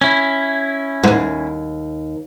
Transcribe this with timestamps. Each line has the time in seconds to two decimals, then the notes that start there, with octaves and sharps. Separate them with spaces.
0.01 C#4 E4
1.04 D#2 G#2